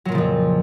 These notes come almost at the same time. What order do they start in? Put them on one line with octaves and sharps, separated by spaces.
F#3 A#2 C#3 F3 F2